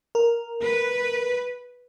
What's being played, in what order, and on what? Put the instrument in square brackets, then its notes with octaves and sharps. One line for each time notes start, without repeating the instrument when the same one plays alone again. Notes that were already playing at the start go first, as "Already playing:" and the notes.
[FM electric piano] A#4
[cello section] B4